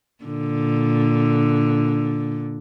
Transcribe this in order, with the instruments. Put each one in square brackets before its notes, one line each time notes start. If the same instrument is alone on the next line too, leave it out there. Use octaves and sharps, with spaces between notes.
[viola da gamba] A#2 D3